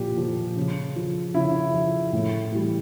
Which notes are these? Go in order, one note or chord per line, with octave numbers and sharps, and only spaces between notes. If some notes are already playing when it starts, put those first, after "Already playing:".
Already playing: A#2 F3 G4
F3
C#3
F3
C#3 E4
F3
A2
E3 G3